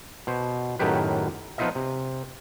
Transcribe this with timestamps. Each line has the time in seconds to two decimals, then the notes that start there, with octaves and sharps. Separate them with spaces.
0.27 B2 C5
0.79 F#2 A2 D#3 F#3 G4 B4
1.58 F3 B3 D#4 F4 D#5 E5
1.75 C3